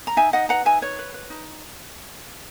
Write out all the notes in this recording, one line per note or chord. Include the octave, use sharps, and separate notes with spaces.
A#5
D#4 E5 G#5
D#4 D#5 F#5
B4 F#5 A#5
D#4 E5 G#5
B4 C#5
B4
B4
D#4